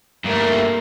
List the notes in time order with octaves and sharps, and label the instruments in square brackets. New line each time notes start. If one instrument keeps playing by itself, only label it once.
[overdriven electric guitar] G2 A3 [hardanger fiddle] A#3